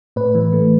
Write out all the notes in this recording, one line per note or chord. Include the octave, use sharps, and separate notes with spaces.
A2 B4
E3
A3